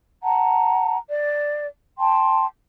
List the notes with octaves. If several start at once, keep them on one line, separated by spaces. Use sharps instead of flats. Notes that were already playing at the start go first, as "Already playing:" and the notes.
F#5 A5 A#5
D5
G5 A5 C6